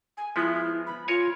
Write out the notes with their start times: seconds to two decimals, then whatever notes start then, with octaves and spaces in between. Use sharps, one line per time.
0.17 G#5
0.36 F3 G#3 B3 E4
0.87 B5
1.08 F4 A#4 C#5 G#5